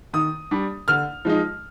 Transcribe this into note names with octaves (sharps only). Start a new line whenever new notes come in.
D#3 D#6
G3 D4
D3 F6
F3 G#3 D#4